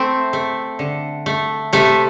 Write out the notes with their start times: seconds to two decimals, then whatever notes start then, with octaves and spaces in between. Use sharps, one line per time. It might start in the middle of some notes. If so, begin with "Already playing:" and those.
Already playing: A3 C4
0.33 A3
0.79 D3
1.26 A3
1.73 C3 A3